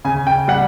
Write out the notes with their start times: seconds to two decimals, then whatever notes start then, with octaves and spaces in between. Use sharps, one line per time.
0.05 C#3 G#5
0.27 G5
0.48 G3 F#5